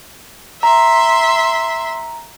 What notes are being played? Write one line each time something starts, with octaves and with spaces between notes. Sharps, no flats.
E5 A#5 C6